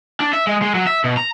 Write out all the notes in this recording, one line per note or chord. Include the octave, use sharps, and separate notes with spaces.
D4
E5
G#3
G#3
F#3
E5
B2
A#5